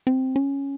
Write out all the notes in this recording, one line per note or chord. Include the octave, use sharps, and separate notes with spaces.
C4
C#4